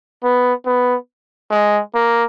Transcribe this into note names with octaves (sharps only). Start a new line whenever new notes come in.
B3
B3
G#3
A#3